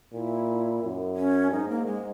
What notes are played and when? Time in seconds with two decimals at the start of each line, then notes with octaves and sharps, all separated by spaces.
0.14 A#2 E4
0.83 F#2
1.17 C#4
1.51 G#2 D#4
1.69 A#3
1.86 G#3